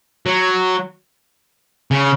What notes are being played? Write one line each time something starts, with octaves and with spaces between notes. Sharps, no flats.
F#3
C#3